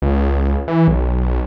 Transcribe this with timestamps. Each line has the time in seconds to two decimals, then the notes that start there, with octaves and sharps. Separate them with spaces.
0.02 C#2
0.68 E3
0.88 B1